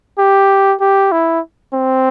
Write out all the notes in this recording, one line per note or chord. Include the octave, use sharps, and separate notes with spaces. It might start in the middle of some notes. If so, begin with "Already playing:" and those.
G4
G4
E4
C4